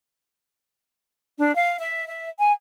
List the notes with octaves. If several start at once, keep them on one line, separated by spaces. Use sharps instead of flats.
D4
F5
E5
E5
G#5